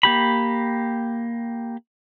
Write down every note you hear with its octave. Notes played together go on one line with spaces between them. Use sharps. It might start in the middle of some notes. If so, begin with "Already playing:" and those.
A#3 G4 B5